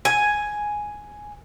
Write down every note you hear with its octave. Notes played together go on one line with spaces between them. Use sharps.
G#5